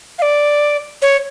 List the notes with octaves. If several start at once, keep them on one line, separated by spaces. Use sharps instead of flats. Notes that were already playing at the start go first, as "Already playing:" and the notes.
F5
D5
C#5